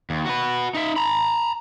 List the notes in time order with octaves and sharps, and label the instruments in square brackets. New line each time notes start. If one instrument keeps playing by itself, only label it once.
[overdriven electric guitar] D#2
F#4 B4
D#4 E5
A#5 B5